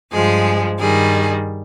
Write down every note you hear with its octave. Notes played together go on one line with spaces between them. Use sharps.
G2 F3 G#3 G#4
G2 D#3 G3 G#4